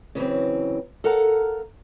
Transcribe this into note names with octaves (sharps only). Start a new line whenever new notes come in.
C#3 E3 F#3 C4
A4 A#4 F5 F#5 A#5